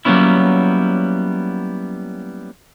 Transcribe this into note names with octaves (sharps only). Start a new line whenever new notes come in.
F#3 G3 A#3 B3 C#4 E4